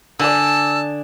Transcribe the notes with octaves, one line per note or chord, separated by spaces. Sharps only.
D3 D5 G#5 A5 D#6 E6